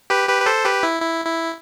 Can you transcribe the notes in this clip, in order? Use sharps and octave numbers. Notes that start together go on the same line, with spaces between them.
G4 B4
G4 B4
B4
A4 C5
G4 B4
E4
E4
E4